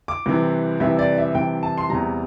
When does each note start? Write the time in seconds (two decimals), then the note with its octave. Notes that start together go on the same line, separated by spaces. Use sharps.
0.08 D6
0.26 C2 C3 E3
0.80 C2 C3 E3 E5
0.99 D5
1.17 E5
1.35 C2 C3 E3 G5
1.63 A5
1.78 C6
1.90 E2 C3 G3 A#5